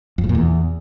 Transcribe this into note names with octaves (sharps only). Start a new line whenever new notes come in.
F2
A2
A#2
E2